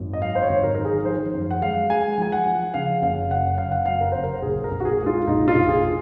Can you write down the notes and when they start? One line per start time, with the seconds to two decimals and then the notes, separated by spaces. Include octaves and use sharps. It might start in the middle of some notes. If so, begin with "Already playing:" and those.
Already playing: G#1 F#2
0.13 D#5
0.22 F#3 F5
0.35 C5
0.42 C#5
0.49 G#1
0.64 A#4
0.75 D#3 A#4
0.85 G#4
1.05 F3 C5
1.34 F#2
1.51 F#5
1.61 G#3 F5
1.90 G#3 G#5
2.18 F3 G#5
2.32 F#5
2.46 F3
2.74 C#3 F5
3.02 F#1 F5
3.31 F#2 F#5
3.58 F#1 F5
3.72 F#5
3.86 F#2 F5
4.01 A#4
4.12 F#1 C5
4.24 A#4
4.42 A#1 G#4
4.64 A#4
4.71 A#1
4.80 F#4
4.85 G#4
4.99 G#3
5.06 F4
5.27 A#1 D#4
5.48 F4
5.55 A#1
5.69 G#4